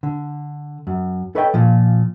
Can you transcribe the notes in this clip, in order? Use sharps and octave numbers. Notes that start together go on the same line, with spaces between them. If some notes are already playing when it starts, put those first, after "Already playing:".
D3
F#2
A4 B4 C#5 D#5 F#5 G5
A#2 F3